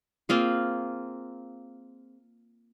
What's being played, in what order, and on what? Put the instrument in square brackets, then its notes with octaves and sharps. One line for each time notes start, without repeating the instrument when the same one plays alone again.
[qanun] A#3 C4 F4 G#4